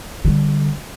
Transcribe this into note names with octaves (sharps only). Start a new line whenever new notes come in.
D3 G3